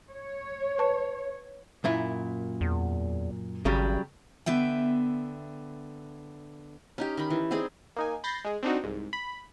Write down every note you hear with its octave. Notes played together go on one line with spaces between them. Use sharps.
C#5
B4 A5 C#6
F#2 A#2 E4
E2
G#1 C#3 F#3 G3
D3 B3 E5 G5
C#4 D#4 G4
D#3 D#4 B5
E3
C4 D#4 G#4 D5
A#3 D#4 G#5
B5 G6 A6 A#6 C7
G#3 G#4
C4 D4 D#4 F#4
C2 G#2
B5